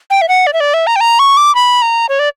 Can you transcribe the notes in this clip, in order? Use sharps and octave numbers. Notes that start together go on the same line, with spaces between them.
G5
E5
F#5
D5
E5
D5
E5
A#5
G5
A#5
C#6
D6
B5
A#5
C#5
D5